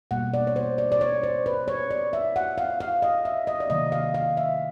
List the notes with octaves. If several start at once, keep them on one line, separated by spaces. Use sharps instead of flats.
B2 G3 A#3 F#5
D5
C#5
C5
D5
D5
C#5
C5
B4
C#5
D5
E5
F#5
F5
F5
D#5
E5
D#5
D5
C3 D#3 F#3 A#3 D#5
F5
F5
E5